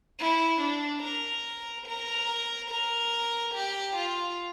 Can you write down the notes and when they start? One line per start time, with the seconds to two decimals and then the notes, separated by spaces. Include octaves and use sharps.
0.19 E4
0.61 D4
1.03 A#4
1.86 A#4
2.70 A#4
3.54 G4
3.96 F4